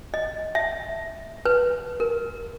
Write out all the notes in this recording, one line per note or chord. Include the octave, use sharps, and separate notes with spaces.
D#5
E5
B4
A#4